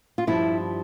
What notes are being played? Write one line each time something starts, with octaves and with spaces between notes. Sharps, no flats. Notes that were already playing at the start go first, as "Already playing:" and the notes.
F4
G2 F3 E4